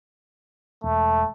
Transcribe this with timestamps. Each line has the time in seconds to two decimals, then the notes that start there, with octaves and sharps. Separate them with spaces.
0.84 E1 A3